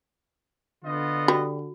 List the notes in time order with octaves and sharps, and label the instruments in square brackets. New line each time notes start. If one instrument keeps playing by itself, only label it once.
[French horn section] D3 [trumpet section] B3 F4 D#5
[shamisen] G3 [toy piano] F#4